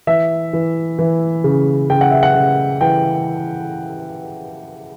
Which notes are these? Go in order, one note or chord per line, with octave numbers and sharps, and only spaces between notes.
E3 E5
E3
E3
C#3
C#3 G5
F#5
E5
F#5
C#3
E3 G5